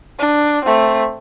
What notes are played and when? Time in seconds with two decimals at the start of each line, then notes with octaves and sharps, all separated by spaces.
0.19 D4
0.65 A3 C4